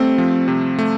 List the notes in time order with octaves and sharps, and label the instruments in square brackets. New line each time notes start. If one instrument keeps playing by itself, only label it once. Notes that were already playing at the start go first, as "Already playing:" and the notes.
Already playing: [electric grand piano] G3 A3 [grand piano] C4
[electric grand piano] F3
C3
A3